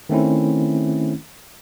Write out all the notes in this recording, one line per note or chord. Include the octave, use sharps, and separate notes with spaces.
D#3 A3 C4 C#4 E4